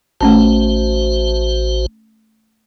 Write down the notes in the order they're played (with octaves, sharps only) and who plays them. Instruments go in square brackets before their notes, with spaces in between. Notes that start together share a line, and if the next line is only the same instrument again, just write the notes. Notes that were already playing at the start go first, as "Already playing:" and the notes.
[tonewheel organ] A1 F#4 C5 [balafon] A3 C#4 A5